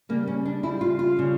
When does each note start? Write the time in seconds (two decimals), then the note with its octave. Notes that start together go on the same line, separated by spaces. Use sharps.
0.09 C#3 G3 A#3
0.27 C#4
0.46 D4
0.63 C#3 G3 E4
0.81 F4
0.99 F4
1.17 C#3 G3